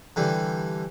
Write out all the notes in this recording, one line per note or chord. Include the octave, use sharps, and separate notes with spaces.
D3 E3 G3